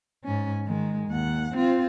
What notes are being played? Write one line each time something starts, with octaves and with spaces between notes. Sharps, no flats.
G#2 C#4
D#3 G#3
D#2 F#5
C4 F4